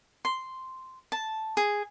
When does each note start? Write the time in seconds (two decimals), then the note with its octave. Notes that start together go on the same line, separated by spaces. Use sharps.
0.25 C6
1.12 A5
1.57 G#4